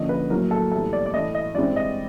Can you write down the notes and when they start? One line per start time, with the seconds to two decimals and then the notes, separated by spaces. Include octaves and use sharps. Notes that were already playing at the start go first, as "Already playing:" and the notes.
Already playing: D3 F3 A#3 C#4 D#5
0.09 B4
0.30 A2 F#3 A#3 A#4
0.51 A4
0.72 A2 E3 G3 B3 A4
0.93 D5
1.06 D5
1.14 A2 E3 A3 D#5
1.35 D#5
1.55 G2 E3 G#3 C4 D5
1.76 D#5